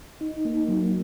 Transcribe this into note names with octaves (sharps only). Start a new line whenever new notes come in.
D#4
A#3
F#3